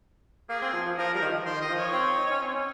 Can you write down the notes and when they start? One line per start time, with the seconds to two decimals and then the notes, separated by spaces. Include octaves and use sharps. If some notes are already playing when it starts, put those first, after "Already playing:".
0.49 A#3 G#4
0.62 C4
0.73 F3
0.86 F3
0.98 F3 A#4
1.14 G3 A#4
1.22 D#3
1.29 F3
1.46 D#3 C5
1.60 D#3 D#5
1.70 F3
1.78 C#5
1.93 C4
2.18 D#4
2.31 C#4
2.43 C4
2.56 C#4